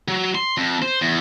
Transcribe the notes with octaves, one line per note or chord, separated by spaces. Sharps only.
F#3
C6
F2
C5
E2